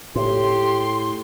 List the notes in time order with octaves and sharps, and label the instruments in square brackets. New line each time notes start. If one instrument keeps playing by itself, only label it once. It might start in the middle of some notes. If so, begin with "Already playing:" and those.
[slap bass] A2 [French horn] G4 [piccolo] C6